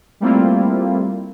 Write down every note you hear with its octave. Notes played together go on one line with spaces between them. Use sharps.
G3 A3 A#3 C4 E4 F4